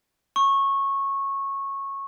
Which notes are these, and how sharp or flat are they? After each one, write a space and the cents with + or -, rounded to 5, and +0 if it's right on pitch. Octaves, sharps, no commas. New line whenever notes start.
C#6 -15